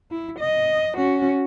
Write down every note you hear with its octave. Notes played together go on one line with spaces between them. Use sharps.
E4
D#5
C#4 F#4